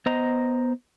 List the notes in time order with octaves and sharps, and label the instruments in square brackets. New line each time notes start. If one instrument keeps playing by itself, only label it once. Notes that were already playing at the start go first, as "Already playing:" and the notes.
[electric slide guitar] B3 C5 D#5 A#5